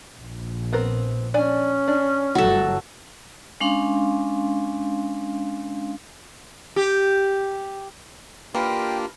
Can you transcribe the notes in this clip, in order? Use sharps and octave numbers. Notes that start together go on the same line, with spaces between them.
A#1
B3 C4 A#4
C#4 D4 D5 G#5
D4
G1 F#3 A3 F#4 A4
G#3 C#4 D4 F5 C6
G4
E3 A#3 D4 F4 G4 A#4 G5